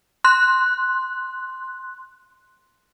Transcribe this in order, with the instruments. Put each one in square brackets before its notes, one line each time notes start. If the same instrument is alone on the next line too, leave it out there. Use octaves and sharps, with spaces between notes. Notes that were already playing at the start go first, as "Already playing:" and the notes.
[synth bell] C6 F#6